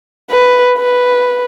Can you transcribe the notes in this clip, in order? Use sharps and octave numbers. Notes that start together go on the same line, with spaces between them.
B4
B4